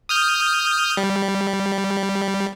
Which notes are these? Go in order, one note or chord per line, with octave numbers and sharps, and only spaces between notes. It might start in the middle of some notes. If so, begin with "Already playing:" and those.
D#6 F6 G6
G3